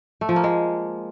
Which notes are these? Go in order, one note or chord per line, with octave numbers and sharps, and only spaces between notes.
A3
F3
A#3
G#3